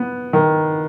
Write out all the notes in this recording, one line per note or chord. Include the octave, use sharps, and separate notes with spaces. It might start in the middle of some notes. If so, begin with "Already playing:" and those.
Already playing: B3
D#3